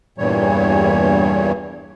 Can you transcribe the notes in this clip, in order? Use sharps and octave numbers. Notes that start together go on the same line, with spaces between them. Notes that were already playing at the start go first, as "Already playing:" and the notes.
E2 G2 A#2 E3 G3 C#5